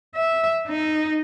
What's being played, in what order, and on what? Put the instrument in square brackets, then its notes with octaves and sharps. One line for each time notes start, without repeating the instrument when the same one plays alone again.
[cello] E5
D#4